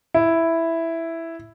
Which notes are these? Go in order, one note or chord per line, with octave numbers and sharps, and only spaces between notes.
E4